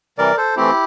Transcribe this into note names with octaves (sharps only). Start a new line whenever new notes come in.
C3 E3 G3 A#4 D5
A4 C5
E3 A3 C4 E4 G4